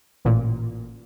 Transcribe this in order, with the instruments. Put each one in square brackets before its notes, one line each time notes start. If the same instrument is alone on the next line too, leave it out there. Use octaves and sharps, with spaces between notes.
[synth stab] A1 A#2